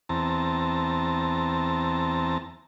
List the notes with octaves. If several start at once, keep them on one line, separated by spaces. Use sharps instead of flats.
E2 C4 A5 A#5